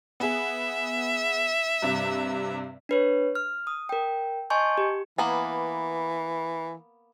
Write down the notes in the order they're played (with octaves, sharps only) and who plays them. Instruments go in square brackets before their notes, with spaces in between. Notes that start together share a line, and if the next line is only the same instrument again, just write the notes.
[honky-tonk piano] B3 G#4 [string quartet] E5
[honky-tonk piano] G2 C3
[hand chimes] D4 B4 C#5
F6
D#6
A#4 G5
D#5 G#5 A5 C6 C#6 G6
G4
[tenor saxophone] E3 [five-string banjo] A#3 B3 G#5